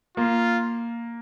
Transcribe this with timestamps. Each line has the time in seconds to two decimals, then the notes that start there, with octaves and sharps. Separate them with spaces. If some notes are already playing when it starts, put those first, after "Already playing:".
0.17 A#3 F4